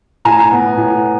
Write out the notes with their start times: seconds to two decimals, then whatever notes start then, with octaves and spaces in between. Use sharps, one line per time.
0.25 A2 G#5 A#5
0.52 B3
0.77 A2